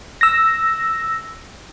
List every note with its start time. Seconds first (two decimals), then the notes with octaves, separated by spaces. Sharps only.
0.21 E6 A#6